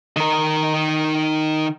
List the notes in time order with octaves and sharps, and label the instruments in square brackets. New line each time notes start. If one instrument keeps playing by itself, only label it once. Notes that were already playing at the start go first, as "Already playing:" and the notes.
[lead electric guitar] D#3 A#4